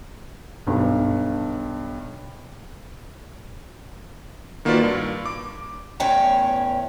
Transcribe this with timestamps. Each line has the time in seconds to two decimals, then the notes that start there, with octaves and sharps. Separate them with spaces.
0.67 B1 G2
4.65 D#3 A#3 F4 F#4 B4 D5
4.83 G2
5.26 D6
6.00 E2 A2 C#4 G5 A#5